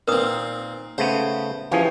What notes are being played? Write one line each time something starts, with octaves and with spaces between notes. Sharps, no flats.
A#2 C4 D#4 A#4 B4 D#6
C#3 A3 B3 C5
E3 F3 C#4 G4 G#4 C#5